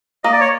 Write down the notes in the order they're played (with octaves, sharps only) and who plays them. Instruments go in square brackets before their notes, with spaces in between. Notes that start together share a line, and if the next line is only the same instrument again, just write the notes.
[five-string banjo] A#3 [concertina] D#5
[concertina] D5
C#5